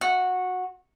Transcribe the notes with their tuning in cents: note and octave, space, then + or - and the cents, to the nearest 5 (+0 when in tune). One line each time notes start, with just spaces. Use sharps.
F#4 -15